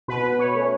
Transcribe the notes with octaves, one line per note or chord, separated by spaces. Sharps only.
B2 B4
B3
B2 C#5
A3 C#4